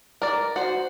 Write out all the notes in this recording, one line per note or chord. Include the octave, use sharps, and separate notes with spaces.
A#4 D5
F#4 C5